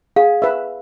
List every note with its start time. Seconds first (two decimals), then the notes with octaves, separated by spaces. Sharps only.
0.16 G#4 F5
0.42 B4 E5